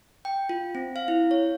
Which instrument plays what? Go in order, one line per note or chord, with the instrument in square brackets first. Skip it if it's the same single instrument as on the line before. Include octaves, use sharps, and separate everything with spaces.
[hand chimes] G5
F4
C4
F5
E4
C#5